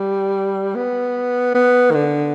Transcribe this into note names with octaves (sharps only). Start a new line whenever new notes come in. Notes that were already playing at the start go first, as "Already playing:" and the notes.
Already playing: G3
B3
B3
D#3
D3